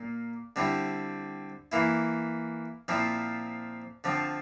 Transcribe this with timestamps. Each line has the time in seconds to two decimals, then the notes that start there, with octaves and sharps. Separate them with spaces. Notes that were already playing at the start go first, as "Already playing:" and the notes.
Already playing: A#2 A#3
0.56 D3 G3 C4 E4
1.72 E3 A#3 E4
2.88 A#2 F3 C4 E4
4.04 D3 F3 C4